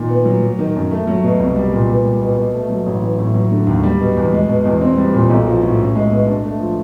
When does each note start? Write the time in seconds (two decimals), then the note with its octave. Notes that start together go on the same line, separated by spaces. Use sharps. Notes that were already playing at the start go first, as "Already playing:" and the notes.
Already playing: A#2 D#3
0.09 B3
0.25 F#3
0.42 F#3
0.59 D#3
0.75 F#2
0.91 A3
1.07 F#3
1.23 B2
1.40 C2
1.56 G3
1.73 A#2
1.89 B3
2.05 G3
2.22 B2
2.37 B2
2.54 A3
2.70 F#3
2.86 A1
3.02 E3
3.19 A2
3.34 F#3
3.52 D3
3.67 D#2
3.83 G3
3.99 B2
4.17 E2
4.33 G#3
4.48 B2
4.65 E2
4.81 C4
4.97 G3
5.14 A#2
5.30 B1
5.46 F3
5.62 A2
5.79 C#4
5.95 G#3
6.11 B2
6.27 D4
6.43 A3
6.60 F3